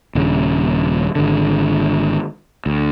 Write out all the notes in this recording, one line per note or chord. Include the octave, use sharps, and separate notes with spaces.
D#1 C#3
G#1 D3
D2